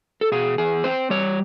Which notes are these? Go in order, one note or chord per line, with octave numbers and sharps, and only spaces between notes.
A4
B2 G#4
E2 G#4
C4 C5
G3 C#5